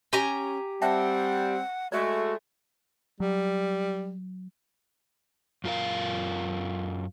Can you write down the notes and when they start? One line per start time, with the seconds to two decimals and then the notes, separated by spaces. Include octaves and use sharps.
0.13 C#4 G4 G#5 A#5
0.82 G3 C4 E5 F#5 G5 A5
1.92 G#3 A3 F#4 D5
3.20 F#3 G3
5.64 F#2 F4 A#4 F5